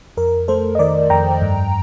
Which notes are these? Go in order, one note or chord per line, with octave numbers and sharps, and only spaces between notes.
F2 A#4
A3 A4 C5
D#5
D#3 A#4 D5
F2 G5 A#5
G2